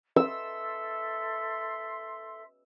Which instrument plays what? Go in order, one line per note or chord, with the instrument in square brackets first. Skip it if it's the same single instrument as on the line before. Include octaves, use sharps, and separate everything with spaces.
[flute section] A4 E5 C6 [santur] E6